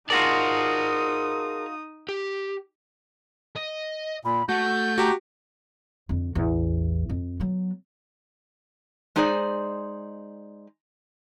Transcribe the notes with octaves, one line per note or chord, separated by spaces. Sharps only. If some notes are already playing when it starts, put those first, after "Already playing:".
D#4 F4 F#4 G#4 A#4 D5 A5 D#6
G4
D#5
A#2 B5
A3 F#4 F#5 G6
F#4 G4 A#5
F2 D3
A1 E2
F2
F#3 B3
G#3 D#4 G#4 C5 D5